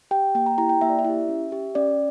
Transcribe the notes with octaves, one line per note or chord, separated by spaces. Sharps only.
G4 G5
A#3 G5
A#5
E4 G4 A#5
G5
A#3 E5
D5
E5
E4 G4
C#4
G4
C#4 D5